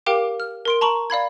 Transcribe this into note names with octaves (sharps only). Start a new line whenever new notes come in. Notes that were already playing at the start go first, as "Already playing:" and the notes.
G4 A#4 F5 G5 D6 D7
F6
A#4 C6 D7
A5 A#5 C#6 F#7
D5 F5 B5 G#6